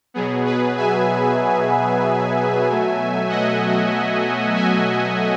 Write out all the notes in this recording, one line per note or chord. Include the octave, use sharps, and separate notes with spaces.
B2 F#3 B3 G#4
G#4 B4
E5 G#5
B2 F#3 A3
D#5 F#5
E5 G#5